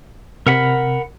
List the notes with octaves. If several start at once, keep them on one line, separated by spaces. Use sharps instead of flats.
C3 A#4 F#5 B5